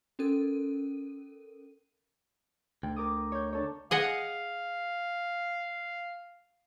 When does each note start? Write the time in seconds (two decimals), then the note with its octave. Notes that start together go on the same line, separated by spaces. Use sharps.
0.19 C#4 A4 A#4 D#7
2.83 D2 G5
2.96 A#4 D6 D#6
3.32 C#5 G6
3.53 D4 A4 C#5
3.91 G#4 D#5 F5 F#5